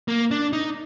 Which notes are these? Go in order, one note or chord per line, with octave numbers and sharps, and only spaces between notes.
A#3
D4
D#4